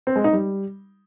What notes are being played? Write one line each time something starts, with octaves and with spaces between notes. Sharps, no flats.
C4
G#3
D#4
G3